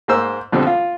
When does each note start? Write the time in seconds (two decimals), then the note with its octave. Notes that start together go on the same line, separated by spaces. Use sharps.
0.08 G#2 A#3 C5 E6
0.52 F2 B2 D3 G3 C4
0.67 F4